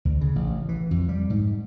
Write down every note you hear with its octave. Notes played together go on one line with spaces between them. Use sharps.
D2
C#3
A1
E3
F2
G3
G#2